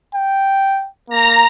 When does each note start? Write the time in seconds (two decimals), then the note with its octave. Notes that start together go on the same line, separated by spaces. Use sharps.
0.15 G5
1.10 A#3 A#5